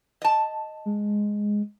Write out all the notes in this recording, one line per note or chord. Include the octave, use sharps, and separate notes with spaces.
D#5 A5
G#3